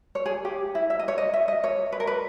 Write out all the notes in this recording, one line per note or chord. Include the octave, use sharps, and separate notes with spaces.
C#5
G#4
G4
E4
E5
D#5
C#5
D#5
E5
D#5
C#5
B4
A#4
B4